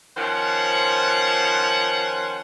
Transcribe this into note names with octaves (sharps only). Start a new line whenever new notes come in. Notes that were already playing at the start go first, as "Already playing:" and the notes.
D#3 F3 C#4 C5 F#5